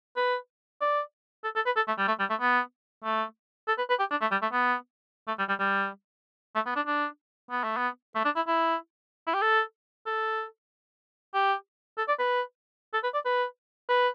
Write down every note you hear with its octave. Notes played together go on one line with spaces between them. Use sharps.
B4
D5
A4
A4
B4
A4
A3
G3
A3
G3
A3
B3
A3
A4
B4
B4
G4
D4
A3
G3
A3
B3
A3
G3
G3
G3
A3
B3
D4
D4
B3
A3
B3
A3
D4
E4
E4
E4
G4
A4
A4
G4
A4
D5
B4
A4
B4
D5
B4
B4